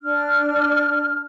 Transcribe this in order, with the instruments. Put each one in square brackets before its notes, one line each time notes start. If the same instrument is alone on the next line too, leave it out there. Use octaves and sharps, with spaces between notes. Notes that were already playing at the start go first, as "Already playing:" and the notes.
[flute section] D4 F6